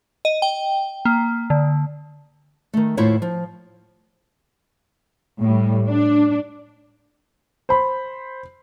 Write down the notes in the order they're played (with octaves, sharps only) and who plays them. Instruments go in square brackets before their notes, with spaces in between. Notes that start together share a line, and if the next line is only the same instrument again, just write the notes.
[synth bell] D#5
G5
A#3
D3
[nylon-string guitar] D#3 A3
D#2 A2 E4 F4 C5 C#5
F3
[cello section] A2 G3
D4
[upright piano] C5 B5